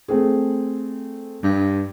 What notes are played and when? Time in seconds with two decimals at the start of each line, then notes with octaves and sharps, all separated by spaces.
0.08 A3 C4 G#4
1.43 G2